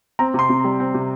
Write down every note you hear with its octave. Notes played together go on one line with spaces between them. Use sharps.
C4 A#5
C3 C6
C3
G3
C4
C3